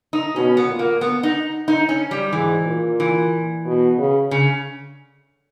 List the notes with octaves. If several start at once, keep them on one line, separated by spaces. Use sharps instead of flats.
D#4
B2 C#4
B3
A#2
A#3
B3
D#4
D#4
C#4
G3
G#2 E3
A#2
E3
B2
C#3
C#3